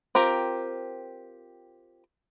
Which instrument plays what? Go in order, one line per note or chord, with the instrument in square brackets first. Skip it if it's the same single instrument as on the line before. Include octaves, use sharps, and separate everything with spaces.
[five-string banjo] C4 F4 G4 A#4